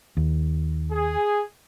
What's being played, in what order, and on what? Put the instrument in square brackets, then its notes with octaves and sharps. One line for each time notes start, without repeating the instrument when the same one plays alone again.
[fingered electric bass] D#2
[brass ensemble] G#4